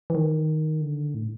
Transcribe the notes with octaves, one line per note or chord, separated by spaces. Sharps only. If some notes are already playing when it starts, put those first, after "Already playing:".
E3
D#3
D3
A2